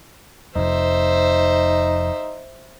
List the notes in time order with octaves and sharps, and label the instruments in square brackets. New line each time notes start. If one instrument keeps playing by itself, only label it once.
[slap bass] F1 F2 [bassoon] D#4 [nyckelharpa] C5 E5